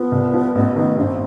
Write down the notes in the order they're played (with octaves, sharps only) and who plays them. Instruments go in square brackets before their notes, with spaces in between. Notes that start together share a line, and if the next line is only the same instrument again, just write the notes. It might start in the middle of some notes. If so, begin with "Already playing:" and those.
Already playing: [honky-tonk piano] F3 [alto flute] B3
[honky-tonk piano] C2
F3
A1
D#3
[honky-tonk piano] G1 [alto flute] C4